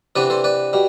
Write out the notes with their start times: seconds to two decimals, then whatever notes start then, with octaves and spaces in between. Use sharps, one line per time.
0.16 C3 E3 B3 D4 B4 D5
0.30 A4 C5
0.44 B4 D5
0.73 B2 G3